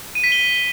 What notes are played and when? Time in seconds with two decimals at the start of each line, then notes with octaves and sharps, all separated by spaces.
0.15 D#7
0.24 B6
0.32 G7